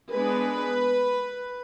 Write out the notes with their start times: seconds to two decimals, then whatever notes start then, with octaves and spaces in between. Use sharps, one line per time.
0.12 G#3 B3 D4 B4